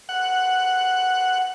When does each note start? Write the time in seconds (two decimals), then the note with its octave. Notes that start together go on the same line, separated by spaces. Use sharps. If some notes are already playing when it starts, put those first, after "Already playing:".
0.09 F#5